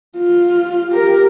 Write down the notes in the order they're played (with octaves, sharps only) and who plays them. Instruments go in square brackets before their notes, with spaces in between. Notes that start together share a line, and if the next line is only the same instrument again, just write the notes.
[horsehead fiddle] F4
G4 A#4